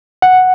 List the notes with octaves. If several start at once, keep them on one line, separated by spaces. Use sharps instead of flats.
F#5